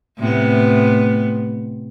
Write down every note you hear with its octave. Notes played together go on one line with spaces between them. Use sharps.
A2 C3 B3